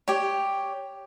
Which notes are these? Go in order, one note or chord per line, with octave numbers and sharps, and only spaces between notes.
G4 C#5